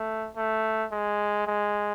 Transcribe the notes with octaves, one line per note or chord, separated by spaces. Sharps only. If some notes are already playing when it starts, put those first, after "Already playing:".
Already playing: A3
A3
G#3
G#3